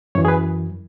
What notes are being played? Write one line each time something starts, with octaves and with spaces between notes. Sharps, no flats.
F#2 E3 C#5
G#4
B4